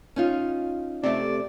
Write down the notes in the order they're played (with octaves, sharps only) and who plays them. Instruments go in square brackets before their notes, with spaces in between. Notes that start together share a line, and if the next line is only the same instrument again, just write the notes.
[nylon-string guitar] C#4 D#4 F4
[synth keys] C3 A3 [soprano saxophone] D5